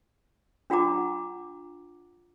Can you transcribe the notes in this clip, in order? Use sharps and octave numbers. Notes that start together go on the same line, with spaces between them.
D4 F4 F#5 A#5 D6